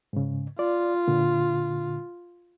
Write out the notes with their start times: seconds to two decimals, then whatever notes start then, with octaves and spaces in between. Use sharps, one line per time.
0.13 G#2 C#3
0.59 F4 D5
1.08 A#2 D3